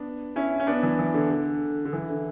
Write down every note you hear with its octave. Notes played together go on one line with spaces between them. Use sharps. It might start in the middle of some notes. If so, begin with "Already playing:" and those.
Already playing: B3 D4
C#4 E4
C#4
B3 D4
E3
E3
D3
D3
D3
E3
D3